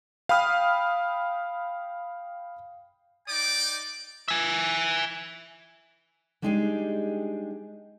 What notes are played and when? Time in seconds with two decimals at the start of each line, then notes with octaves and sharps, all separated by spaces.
0.29 F5 G5 B5 D#6 F6
3.28 D#4 D5 G5 D6
4.28 E5 G#5
6.42 G3 G#3 D4 D#4 G4 G#4